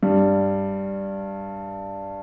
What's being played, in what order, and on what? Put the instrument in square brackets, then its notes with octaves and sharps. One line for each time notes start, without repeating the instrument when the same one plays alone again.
[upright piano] G2 G3